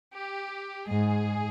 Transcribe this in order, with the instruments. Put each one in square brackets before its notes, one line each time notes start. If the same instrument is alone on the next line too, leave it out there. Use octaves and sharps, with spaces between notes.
[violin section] G4
[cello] G#2 [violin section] G#4